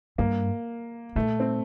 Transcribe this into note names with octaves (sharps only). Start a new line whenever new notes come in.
G2 A#3
A#2 A3
C4